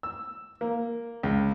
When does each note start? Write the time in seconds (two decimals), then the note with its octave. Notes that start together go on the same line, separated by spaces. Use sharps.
0.03 E6
0.61 A#3
1.23 C#2